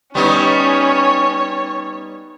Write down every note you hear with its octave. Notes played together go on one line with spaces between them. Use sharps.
G3 B3 C#4 D#4 C#5